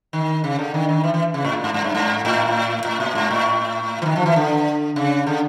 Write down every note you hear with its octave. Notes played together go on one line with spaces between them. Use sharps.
D#3
C#3
D3
D#3
D#3
E3
E3
C#3
A2
A#2
G#2
G#2
G2
G#2
A2
A2
A#2
G#2
A2
E3
D#3
F3
E3
D3
C#3
D3